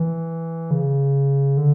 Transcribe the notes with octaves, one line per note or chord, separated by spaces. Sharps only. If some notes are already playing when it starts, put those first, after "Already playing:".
Already playing: E3
C#3
D3